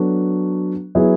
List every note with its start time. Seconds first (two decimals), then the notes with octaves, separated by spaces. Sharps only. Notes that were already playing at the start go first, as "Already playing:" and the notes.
Already playing: F#3 B3 D4 F#4 A4
0.95 F#3 B3 E4 G#4